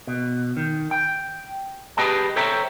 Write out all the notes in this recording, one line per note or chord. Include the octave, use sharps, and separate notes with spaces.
B2
D#3
G5
G4 G#4 B4 D#5 G5 A5
A4 C5 C#5 E5 G5 A#5